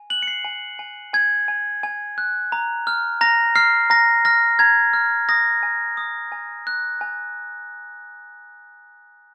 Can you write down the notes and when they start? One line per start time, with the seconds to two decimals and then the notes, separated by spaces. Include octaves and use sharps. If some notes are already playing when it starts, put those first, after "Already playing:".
Already playing: G#5
0.10 F#6 F#7
0.22 C#7
0.27 C7
0.44 G#5
0.79 G#5
1.13 G#5 G#6
1.48 G#5
1.83 G#5
2.18 F#6
2.52 A#5
2.87 F6
3.21 A#5 A#6
3.56 F6 C7
3.90 A#5 A#6
4.25 F6 A#6
4.59 A#5 G#6
4.93 F6
5.29 D#6 A#6
5.63 G#5
5.97 D#6
6.32 G#5
6.67 F#6
7.01 G#5